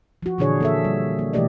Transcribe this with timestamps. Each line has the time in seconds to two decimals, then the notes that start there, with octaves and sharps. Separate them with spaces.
0.23 F3 F#4
0.38 A#2 D3 E3 D4 G#4 C#5
0.60 A#3 A4 E5
0.84 G3
1.19 A#3
1.33 B2 E3 A3 G4 D5 D#5